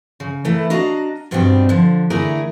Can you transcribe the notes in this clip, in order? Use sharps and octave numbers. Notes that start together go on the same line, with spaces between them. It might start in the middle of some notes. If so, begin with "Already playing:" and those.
C#3
E3 A3 A#3 E4
D4 F#4 D#5 F5 A#5
G2 B2 C4 D4 D#4 G4
D3 F3
D3 E3 A3 E4 G#4 A#4